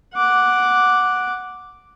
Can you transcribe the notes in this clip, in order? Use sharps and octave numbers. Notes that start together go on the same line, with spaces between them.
F#5 D6